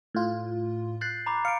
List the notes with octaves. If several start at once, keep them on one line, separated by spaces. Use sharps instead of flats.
A2 F4
F#6 G6 A6 C7
A#5 B5 D6
F5 C#7 D7